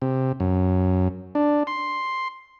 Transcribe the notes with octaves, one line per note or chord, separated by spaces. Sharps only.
C3
F#2
D4
C6